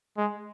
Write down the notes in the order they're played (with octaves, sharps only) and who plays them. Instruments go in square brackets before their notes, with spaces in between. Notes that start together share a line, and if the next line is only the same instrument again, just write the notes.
[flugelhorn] G#3